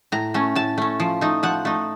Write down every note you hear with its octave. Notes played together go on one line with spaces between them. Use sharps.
A2 A#5
A3 C#4
A2 A5
A3 C#4
F3
A3 D#4
F3 F#5
A3 D#4